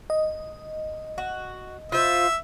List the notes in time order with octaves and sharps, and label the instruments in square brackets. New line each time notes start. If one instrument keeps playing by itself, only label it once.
[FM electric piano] D#5
[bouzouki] F#4
[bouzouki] F4 C5 [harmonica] E5